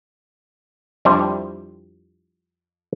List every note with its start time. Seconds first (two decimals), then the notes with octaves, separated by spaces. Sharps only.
1.05 F2 G3 D4 E4 C5